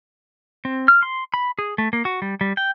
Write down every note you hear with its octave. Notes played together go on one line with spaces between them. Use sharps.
C4
F6
C6
B5
G#4
A3
A#3
F#4
G3
G3
G5